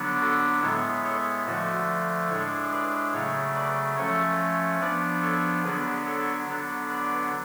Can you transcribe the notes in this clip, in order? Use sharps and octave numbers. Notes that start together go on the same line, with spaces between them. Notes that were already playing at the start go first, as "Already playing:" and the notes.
Already playing: D3 F#3 B3 D4
F#4 A4
A2 G#3 B3 A4 C#5
A4 C#5
D3 F3 A3 F#4 A4
A2 G#3 D4 A4 C#5
B4 D5
C#3 F#3 A3 C#5 F5
B4 D5
F3 A3 C#4 A4 C#5
F3 B3 D4 B4 D5
A4 C#5
D3 F#3 B3 D4 G#4 B4
A4 C#5
D3 F#3 B3 D4
B4 D5